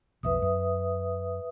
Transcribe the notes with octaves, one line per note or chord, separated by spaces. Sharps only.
B1 F2 B4 E5 D#6
F#2